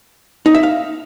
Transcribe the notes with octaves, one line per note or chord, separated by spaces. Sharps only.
D#4
E5
F5